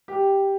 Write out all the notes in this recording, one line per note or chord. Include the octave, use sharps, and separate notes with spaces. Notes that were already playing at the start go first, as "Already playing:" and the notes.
G4